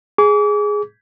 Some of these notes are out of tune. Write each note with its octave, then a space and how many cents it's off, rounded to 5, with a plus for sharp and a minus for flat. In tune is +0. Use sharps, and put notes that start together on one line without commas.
G#4 +0 D6 -40